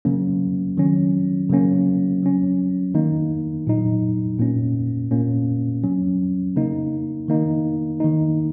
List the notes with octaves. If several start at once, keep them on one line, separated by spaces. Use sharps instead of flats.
C#3 F#3 A#3 C#4
D#3 F#3 C#4
C#3 F#3 A#3 C#4
F#3 C#4
D#3 A#3 D#4
A#2 F#3 D#4
A#2 A#3 C#4
A#2 A#3 C#4
F#3 C#4
C#3 A#3 D#4
D#3 A#3 D#4
D#3 A#3 D#4